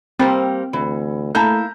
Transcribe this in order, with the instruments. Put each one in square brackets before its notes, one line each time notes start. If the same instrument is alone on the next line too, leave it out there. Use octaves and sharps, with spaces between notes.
[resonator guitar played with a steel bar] G3 A#3 C5 [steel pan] C4
[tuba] D2 [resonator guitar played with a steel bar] E3
[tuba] A3 [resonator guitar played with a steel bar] A#3 E4 [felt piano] A5 A#5 G6